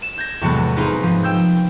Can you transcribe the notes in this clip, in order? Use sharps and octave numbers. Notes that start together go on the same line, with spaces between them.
E7
G6 G#6 A#6
E2 A2 C3 F#3 G#3 B3
C4 D#4 F4 G#4 A#4 B4
G#2 F3
G5 E6 G6